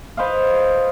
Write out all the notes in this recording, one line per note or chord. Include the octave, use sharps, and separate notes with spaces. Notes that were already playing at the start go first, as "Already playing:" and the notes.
B4 C5 D#5 F5